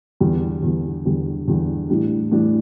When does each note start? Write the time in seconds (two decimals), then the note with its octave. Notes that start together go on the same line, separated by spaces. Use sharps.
0.20 E2 D3 G3
0.63 E2 D3 G3
1.05 E2 D3 G3
1.48 E2 D3 G3
1.89 A2 E3 G3 D4
2.31 A2 E3 G3 D4